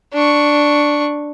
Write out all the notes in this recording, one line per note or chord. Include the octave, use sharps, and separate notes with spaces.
D4 C#6